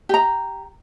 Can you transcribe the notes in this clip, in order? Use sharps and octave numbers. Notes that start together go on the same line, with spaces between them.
G4 A#5